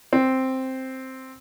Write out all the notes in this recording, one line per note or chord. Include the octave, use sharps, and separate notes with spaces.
C4